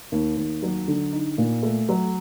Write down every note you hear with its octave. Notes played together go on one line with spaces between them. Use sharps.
D#2
D#2
F#3
D3
D#4
A#2
A3
F#3